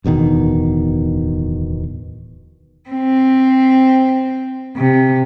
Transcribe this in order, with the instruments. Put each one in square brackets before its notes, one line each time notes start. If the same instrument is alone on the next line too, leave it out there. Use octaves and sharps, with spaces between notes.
[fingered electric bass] D1 E2 B2 D#3
[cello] C4
C3